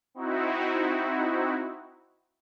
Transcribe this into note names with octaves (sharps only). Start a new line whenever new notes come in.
C4 D#4 E4 F#4